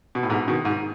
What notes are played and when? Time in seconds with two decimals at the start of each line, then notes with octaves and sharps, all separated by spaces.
0.15 B2
0.23 A2
0.30 G#2 B2
0.48 B2 D#3
0.65 G#2